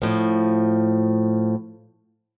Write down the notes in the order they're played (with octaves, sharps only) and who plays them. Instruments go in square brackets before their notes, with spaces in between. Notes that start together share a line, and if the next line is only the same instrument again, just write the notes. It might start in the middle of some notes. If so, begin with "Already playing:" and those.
[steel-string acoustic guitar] A2 F3